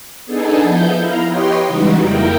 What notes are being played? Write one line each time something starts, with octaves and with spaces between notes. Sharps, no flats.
B3 D4 D#4 G#4 A4
F3 B3 E4 G6
E4 F5 A#5
G4 B4 C#5 D#5 G5 C6
C#3 E3 G3 G#3 D#4 F#4
F2 A#3 E4 A#4 G5